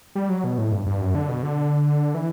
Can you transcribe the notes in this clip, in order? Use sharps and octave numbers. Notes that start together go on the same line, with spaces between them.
G3
F#3
B2
A2
G2
G2
F#2
D3
B2
D3
E3